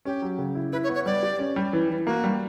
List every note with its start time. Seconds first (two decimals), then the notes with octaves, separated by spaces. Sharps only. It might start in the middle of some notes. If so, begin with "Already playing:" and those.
0.05 C#4 G4
0.22 F#3
0.39 C#3
0.55 E4
0.72 E4 B4
0.84 C#5
0.89 B3
0.95 C#5
1.06 G3 D5
1.23 G4
1.39 C#4
1.56 G3
1.73 E3
1.90 E3
2.06 A#3 F#4
2.24 G3